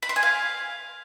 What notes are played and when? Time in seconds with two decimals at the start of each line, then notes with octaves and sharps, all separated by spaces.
0.02 B5
0.09 C6
0.16 G#5
0.23 F5